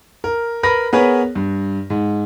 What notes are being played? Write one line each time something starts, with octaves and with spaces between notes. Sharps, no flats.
A#4
A#4 B4 B5 A#6
B3 G#4 A#4 B4 C#5
G2
G#2